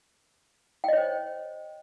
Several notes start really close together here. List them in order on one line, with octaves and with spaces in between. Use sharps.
G5 D#5 C#5 C5